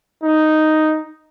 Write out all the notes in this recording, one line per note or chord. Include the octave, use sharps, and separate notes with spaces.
D#4